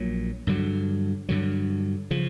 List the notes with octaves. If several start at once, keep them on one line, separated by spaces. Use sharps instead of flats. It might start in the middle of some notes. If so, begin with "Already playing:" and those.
Already playing: A#1 A#2 F#3
G2 D3 F#3
G2 D3 F#3
C#3 F3